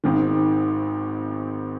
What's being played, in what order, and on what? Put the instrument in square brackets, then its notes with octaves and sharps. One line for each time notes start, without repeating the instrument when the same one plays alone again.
[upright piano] G#1 G#2 D#3